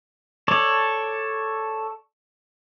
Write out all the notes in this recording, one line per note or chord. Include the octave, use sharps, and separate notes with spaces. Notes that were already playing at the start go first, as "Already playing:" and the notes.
A4 C#5 D5